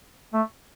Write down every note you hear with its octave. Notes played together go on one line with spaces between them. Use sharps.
A3